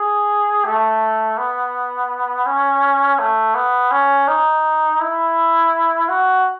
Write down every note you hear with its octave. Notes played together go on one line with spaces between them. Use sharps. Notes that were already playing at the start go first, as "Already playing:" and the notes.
Already playing: G#4
A3
B3
C#4
A3
B3
C#4
D#4
E4
F#4